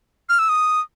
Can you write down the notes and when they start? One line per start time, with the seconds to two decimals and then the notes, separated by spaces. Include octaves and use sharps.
0.29 F6
0.39 E6
0.49 D#6